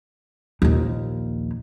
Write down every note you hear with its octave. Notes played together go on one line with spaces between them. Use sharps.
A#1 D#2